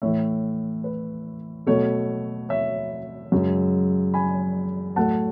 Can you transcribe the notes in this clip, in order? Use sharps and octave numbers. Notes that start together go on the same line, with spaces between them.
A2 E3 A3 C#5 E5
B4
B2 F#3 A3 A4 C#5
C#5 E5
F#2 C#3 G#3
G#5 B5
A2 F#3 A3 F#5 A5